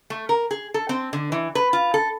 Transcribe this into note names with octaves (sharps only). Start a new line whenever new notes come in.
A3
A#4
G#4
A4
C4
D3
E3
B4
F4
A4